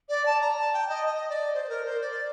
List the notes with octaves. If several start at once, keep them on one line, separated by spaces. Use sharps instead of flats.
D5
A5
A#5
A5
G5
D#5
D#5
D5
C5
C5
A#4
C5
D5